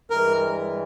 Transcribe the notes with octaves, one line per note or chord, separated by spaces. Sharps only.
G2 E3 G#3 A#4